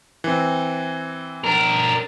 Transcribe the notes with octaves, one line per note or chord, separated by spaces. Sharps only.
E3 C4
D4 A#4